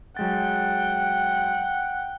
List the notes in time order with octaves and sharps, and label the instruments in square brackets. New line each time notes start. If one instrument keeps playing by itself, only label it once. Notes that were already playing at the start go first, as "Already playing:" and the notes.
[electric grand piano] F#3 G#3 A6 [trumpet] F#5 [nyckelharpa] G5